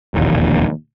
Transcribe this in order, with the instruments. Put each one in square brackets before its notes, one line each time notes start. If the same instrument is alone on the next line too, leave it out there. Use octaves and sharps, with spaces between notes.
[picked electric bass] E1 A#1 D#2